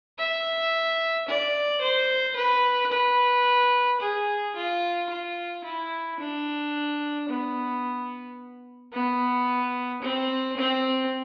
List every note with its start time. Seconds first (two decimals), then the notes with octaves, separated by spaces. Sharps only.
0.18 E5
1.28 D5
1.81 C5
2.36 B4
2.91 B4
4.01 G#4
4.55 F4
5.09 F4
5.64 E4
6.20 D4
7.29 B3
8.93 B3
10.02 C4
10.57 C4